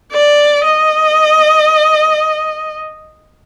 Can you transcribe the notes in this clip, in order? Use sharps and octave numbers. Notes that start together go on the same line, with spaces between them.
D5
D#5